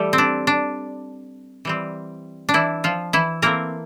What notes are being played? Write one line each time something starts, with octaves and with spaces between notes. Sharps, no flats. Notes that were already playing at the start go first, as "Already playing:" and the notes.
Already playing: E3 G3 A3 G4 A4
C4
D4
D4
E3 G3 C4
D4
E3 E4
F3 F4
E3 E4
E3 A3 A#3 C4 A#4